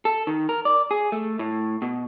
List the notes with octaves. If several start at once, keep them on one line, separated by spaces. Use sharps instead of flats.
A4
D#3
A#4
D5
G#4
A3
A2
B2